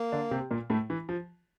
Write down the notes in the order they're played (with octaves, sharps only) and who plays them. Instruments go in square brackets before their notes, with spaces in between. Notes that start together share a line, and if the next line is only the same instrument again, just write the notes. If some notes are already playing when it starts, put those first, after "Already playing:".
Already playing: [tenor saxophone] A#3
[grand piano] D3 D4
C3 C4
A#2 A#3
A2 A3
E3
F3